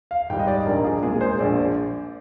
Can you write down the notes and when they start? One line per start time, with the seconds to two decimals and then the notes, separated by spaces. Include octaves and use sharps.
0.11 F5
0.30 G#2 D#3 G3 G5
0.39 D#5
0.47 D5
0.66 A#1 A#4
0.84 G#4
1.03 A#2 G#3 G#4
1.21 C5
1.39 A#1 D5